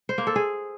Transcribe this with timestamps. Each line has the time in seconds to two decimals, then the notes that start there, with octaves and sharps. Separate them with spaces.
0.09 C5
0.18 A#3
0.27 A4
0.36 G#4